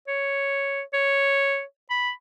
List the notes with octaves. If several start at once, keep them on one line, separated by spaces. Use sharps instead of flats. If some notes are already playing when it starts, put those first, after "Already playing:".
C#5
C#5
B5